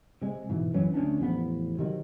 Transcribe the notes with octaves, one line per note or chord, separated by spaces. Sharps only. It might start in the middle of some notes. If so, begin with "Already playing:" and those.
C3 G#3
G#2 B2 E3
F#1 E3 F#3 C#4
D2 A3 C#4 D4
A1 E2 F3 B3
C3 D#3 F#3